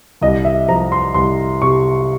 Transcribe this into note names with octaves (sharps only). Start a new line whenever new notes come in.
C2 D#5
E5
F3 A#5
C6
C2 C6
C3 C#6